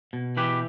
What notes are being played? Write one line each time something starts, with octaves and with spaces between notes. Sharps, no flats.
B2
E3 G4 B4